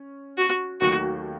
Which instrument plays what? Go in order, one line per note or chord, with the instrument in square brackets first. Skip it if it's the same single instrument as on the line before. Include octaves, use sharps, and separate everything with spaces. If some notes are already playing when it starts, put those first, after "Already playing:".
Already playing: [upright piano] C#4
[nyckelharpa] F#4
[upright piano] D#2 D#3 F#3 A3 [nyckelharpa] F#4